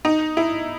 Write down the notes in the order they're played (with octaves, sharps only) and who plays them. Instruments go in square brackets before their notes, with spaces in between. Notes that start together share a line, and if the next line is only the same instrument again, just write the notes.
[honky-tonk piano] D#4
E4